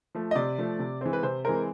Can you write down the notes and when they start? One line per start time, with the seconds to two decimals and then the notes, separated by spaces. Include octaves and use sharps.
0.15 F3 A3
0.31 D#5
0.35 C3 D5
0.58 F3 A3
0.79 C3
1.01 E3 G#3 C4
1.13 B4
1.23 C3 C5
1.45 E3 G#3 C4 A#4